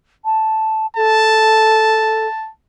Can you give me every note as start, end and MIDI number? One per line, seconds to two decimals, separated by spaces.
0.25 0.87 81
0.96 2.27 69
0.96 2.49 81